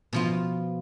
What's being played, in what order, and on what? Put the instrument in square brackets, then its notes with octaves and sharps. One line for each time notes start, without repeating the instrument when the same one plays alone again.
[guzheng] B2 F3 F4